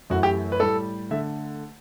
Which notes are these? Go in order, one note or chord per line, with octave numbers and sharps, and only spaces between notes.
F#2 E3 A3 F#4
G4
B4
A2 G3 A4
D3 A3 E5